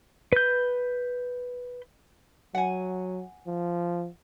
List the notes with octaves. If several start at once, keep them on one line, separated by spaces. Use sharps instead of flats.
B4 G6
F#3 F#5 G#5
F3